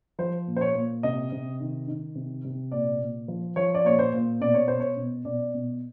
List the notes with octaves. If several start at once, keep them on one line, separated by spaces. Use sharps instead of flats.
F3 C5
A#2
C5
C#5
A#2
C3 D#5
C3
D#3
D#3
C3
C3
A#2 D5
A#2
F3
F3 C#5
D5
A#2 C#5
C5
A#2
B2 D5
C#5
B2 C5
C#5
B2
B2 D5
B2